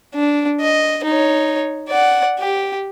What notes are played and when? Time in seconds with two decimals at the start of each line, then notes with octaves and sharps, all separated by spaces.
0.15 D4
0.61 D#5
1.04 D#4 C#5
1.89 D5 F#5
2.39 G4